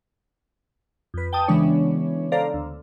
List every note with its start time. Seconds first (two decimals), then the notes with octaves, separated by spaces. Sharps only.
1.14 F2 B4
1.33 G5 A5 D#6
1.48 C#3 E3 G#3 B3 D4 C#5
2.32 A4 C5 D5 F5 A#5
2.54 D2